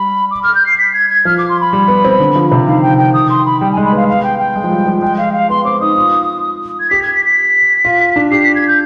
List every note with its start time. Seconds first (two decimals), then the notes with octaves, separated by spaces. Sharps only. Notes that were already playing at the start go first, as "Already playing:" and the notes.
Already playing: G3 B5
0.31 D6
0.43 F6
0.55 G6
0.66 C7
0.78 B6
0.94 G#6
1.10 G#6
1.25 F3 F6
1.38 D6
1.49 C6
1.61 B5
1.73 G3
1.88 B3
2.05 C4
2.20 D3
2.36 F3
2.52 C3
2.67 D#3 F5
2.82 G5
2.98 G5
3.14 D#6
3.30 C6
3.46 B5
3.60 G3 G5
3.72 G#3 G#5
3.85 B5
3.92 B3 F5
4.08 F5
4.23 G5
4.39 G5
4.56 G#3
4.64 F3
4.71 G3
4.87 F3
5.02 G#3 G5
5.18 F5
5.33 F5
5.49 B3 C6
5.65 C4 D6
5.81 D#4 D#6
5.96 F4
6.80 G#6
6.90 G4 B6
7.03 G#6
7.14 B6
7.25 B6
7.85 F4
8.16 D4
8.31 G4 C7
8.44 B6
8.56 G#6
8.68 G6